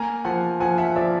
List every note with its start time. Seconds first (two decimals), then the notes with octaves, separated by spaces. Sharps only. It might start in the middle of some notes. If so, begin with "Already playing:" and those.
Already playing: A#3 G#5 A#5
0.25 F3 F#5 G#5
0.60 F3 F#5 G#5
0.78 E5 F#5
0.96 F3 D5 E5